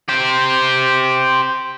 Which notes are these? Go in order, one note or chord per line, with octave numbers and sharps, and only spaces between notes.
G4 C5